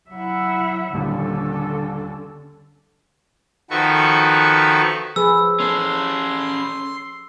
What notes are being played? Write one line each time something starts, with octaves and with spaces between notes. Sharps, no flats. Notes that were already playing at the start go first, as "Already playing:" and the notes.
F#3 E4 E5 F#5
D#1 A#1 D#2 D3 C#4 A4
D#3 F3 F#4 A4 B4 C#6
F3 G#4 B4 E6
C#4 A4 C6